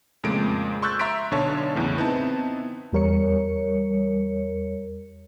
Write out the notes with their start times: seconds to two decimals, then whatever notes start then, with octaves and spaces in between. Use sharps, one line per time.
0.24 F2 A#2 C#3 G#3 A3 D7
0.82 C6 C#6 E6 F#6 G6 A6
0.99 E5 A#5 C6 E6 B6 D7
1.31 B1 D3 C#5 A5
1.75 E2 A2 C#3
1.98 B3 C4 D#4 E4 A5
2.93 E2 G3 A#4 C#5 C#7